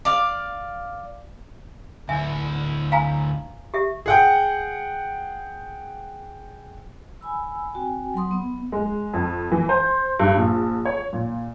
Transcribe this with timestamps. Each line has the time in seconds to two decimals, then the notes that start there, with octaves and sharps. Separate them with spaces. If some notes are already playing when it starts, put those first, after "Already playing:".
0.05 D5 F5
2.09 D2 E4 E5 G#5
2.92 F5 G#5 A#5
3.74 G4 E5
4.06 G#4 F#5 G5
7.21 G#5 B5 E6
7.73 C4 F#4 G5 G#5
8.14 F#3 F#5 C6 D#6
8.31 B3
8.72 G#3
9.13 F2
9.52 E3
9.69 C5
10.20 G2
10.38 A#1
10.85 C#5
11.13 A#2